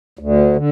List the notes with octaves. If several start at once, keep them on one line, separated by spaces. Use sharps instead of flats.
D2
D3